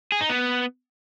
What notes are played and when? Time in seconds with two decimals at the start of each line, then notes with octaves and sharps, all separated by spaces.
0.12 G#4
0.21 D#4
0.29 B3